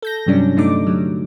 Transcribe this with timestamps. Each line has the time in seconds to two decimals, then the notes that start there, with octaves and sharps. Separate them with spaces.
0.02 A4 G6 A#6
0.26 G2 C3 F#3 G3 C#4 D4
0.56 G2 D3 A3 D4 D#4 D6
0.87 F#3 G3